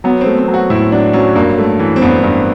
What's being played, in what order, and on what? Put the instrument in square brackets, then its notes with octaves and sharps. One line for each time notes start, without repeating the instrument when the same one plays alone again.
[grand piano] F#3 B3
C4
A3
C4
F#3
F#4
A2 E4
F#3 D4
F#3 C#4
G2 A#3
A3
E3
C4
G2 B3
G2 C4